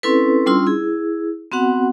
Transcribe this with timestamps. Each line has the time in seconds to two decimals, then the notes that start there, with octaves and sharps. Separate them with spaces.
0.03 C4 C#4 E4 A4 B4
0.46 G3 C#4 D4 F4 C6 E6
0.67 E4 G#4
1.52 B3 C4 F#4 F#5